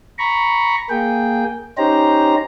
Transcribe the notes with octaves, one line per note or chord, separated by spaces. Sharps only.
A#5 B5 C#6
A#3 G#4 G5
C#4 D#4 G4 C5 A#5